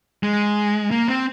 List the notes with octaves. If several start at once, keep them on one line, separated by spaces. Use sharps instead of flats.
G#3
A#3
C4